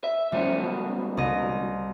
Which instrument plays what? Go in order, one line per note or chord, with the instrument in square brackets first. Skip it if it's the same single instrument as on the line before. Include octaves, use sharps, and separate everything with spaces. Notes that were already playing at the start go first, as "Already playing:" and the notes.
[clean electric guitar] E5
[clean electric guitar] D2 F3 C#4 [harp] G3
[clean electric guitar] C#2 G#2 B2
[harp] C2 D#5